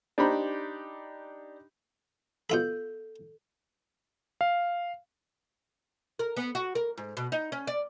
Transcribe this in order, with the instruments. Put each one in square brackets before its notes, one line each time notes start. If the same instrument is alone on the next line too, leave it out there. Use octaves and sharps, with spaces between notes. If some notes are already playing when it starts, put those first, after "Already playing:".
[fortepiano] D4 D#4 G4 C5 A#5 B5
[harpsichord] B2 F4 B5 [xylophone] A4 G6
[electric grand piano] F5
[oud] A#4
B3
F#4
A#4
G#2
B2
D#4
C#4
D5